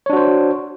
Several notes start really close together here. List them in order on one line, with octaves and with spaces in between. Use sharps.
C#5 D4 F#4 C5